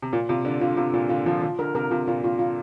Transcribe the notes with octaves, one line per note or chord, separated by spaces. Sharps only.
C3
A#2 F4
C3 F4
D3 D5
D3 F4
C3 F4
A#2 F4
D3 F4
F3 F4
F3 F4
D3 A#4
C3 A#4
C3 F4
A#2 F4
F4
F4